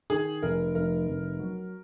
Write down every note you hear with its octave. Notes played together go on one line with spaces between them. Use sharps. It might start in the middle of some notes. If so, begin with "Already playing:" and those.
D#3 G#4
F1 A#4
F1 A#4
F1
F#3